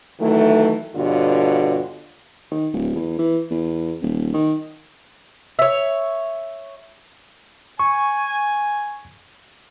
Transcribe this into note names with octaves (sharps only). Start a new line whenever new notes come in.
D#3 E3 F#3 A3
G2 B2 D3 F4 G4 C#5
D#3
D1
E2
E3
E2
D#1
D#3
C#5 E5
G#5 C#6